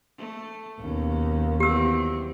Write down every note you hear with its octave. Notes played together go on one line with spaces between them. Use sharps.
A3
D#2 B2 C#4
E2 F#3 C4 G4 E6